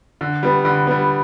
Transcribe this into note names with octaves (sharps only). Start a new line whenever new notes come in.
D3
G3 B3
D3
G3 B3